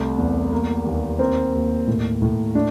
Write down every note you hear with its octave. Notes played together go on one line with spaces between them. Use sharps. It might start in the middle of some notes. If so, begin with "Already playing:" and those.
Already playing: C2 A3
E2
A#3
D#2
A#3 C4
D#2
A2
A2
A3 D4